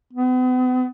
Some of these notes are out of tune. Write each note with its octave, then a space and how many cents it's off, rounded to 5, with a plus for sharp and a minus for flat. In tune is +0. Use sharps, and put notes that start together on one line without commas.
B3 +40